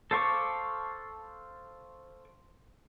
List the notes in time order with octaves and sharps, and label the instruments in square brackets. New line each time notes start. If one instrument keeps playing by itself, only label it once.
[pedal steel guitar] A4 C5 F5 C#6 D6